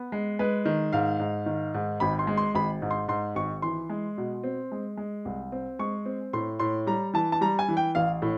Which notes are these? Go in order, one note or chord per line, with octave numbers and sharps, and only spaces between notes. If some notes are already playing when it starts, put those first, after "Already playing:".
Already playing: B3
G#3
G#3 B4
D#3
G#2 F5
G#2
D#3
G#2
G#1 B5
C6
G#3
C6
G#1 B5
G#2
C6
G#2 C6
G#1 C#6
E3 C6
G#3
B2
C4
G#3
G#3
C2
C4
G#3 C#6
C4
A2 C6
A2 C6
G3 A#5
E3 A5
A5
G3 A#5
G#5
E3
G5
A1 F5
A2